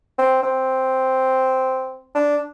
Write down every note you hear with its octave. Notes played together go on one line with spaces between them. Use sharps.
C4
C4
D4